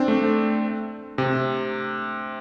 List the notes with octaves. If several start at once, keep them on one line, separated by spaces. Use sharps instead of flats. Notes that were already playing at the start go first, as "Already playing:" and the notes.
Already playing: C4 D4
A3
C3